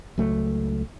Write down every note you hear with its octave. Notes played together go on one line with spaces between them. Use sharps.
C#2 F#3 A3